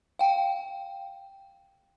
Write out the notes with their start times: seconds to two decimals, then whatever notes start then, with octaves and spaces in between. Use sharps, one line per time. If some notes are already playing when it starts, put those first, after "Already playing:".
0.19 F5 G5